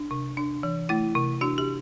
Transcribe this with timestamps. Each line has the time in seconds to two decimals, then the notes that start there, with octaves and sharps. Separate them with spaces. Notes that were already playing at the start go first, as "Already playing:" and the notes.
Already playing: D4
0.11 C3
0.37 D4
0.63 E3
0.89 A3 E4
1.15 C3
1.41 D4 F#4
1.58 G4